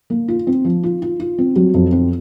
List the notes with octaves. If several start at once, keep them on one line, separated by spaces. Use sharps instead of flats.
A#3
F4
C4
F3
F4
F4
F4
C4
F#3
F2
C4